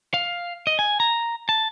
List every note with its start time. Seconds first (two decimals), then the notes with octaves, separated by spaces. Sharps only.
0.14 F5
0.67 D#5
0.79 G#5
1.00 A#5
1.49 A5